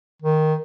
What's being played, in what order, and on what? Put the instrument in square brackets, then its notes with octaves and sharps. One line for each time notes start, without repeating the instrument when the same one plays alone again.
[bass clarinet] D#3